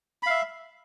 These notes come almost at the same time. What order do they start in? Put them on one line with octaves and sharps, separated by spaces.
B5 F5 E5